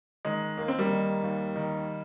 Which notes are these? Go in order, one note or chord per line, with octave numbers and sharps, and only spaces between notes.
D#3 G#3
D#2 A#3
C4
G3 A#3
D#3
D#2
D#3